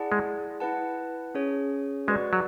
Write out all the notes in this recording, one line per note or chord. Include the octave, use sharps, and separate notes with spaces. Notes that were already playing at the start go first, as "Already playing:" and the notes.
Already playing: E4 G#4 D5 F#5 A5
G#3
E4 B4 F#5 A5
C#4 G#4 C#5
G#3 F#4 B4 D5
F#3